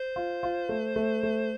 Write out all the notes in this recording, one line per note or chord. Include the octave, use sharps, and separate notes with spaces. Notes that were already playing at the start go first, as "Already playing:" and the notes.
Already playing: C5
F4
F4
A3
A3
A3